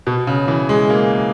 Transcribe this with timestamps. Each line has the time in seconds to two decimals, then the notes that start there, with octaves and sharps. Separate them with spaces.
0.07 B2
0.27 C#3
0.48 E3
0.69 G#3
0.90 A#3